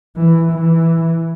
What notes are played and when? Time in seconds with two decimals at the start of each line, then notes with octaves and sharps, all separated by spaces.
0.16 E3
0.52 E3